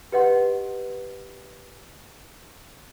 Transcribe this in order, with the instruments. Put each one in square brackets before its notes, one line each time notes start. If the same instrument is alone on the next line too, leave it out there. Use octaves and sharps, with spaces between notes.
[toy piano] G4 B4 D#5 F#5 C6